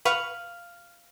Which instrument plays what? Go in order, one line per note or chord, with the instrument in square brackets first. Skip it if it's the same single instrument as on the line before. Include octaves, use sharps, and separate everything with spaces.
[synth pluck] B4 F#5 C#6 [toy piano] F5 [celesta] F6 F7 F#7